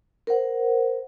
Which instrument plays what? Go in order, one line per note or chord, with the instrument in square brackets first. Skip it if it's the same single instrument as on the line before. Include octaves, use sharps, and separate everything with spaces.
[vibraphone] A#4 C5 F#5